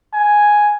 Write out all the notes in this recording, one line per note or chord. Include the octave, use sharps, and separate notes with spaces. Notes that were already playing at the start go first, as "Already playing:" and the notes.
G#5